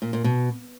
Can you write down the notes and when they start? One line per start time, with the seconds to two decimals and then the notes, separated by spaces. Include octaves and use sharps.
0.02 A#2
0.13 A#2
0.24 B2